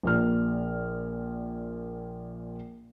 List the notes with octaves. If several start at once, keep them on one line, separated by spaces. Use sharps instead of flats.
A#1 A#2 F6